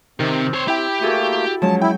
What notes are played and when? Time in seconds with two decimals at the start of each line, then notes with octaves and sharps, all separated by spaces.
0.20 C3 D#3 C4
0.54 C5 C#5
0.68 E4 G4 G5
1.01 A3 A#3 F#4 G#4 A4
1.62 F3 F#3 G#3 C#4 A5
1.82 E4 G5